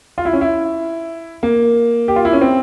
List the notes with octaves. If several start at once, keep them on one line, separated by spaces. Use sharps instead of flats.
F4
E4
C#4
E4
A#3
G4
F4
E4
C#4
C4